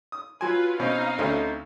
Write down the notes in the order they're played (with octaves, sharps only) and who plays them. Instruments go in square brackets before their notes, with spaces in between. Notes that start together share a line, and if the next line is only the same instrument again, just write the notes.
[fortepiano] D#6
[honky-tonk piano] F#3 C6 [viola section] F4 B4 [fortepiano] G#5
[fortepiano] B2 C4 C#4 [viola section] D#4 F5
[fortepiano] D2 B5 [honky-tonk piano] A3 C4 C#4